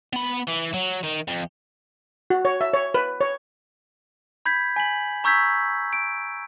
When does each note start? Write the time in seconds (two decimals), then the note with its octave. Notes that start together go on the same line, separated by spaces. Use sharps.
0.13 B3 B5
0.47 E3
0.74 F#3
1.04 D#3
1.28 F2
2.30 F#4
2.45 C#5
2.61 E5
2.73 C#5
2.94 B4
3.21 C#5
4.46 B5 G6 G#6 B6
4.76 G#5 B6 F#7
5.24 A#5 C#6 E6 G6 G#6 B6
5.93 D7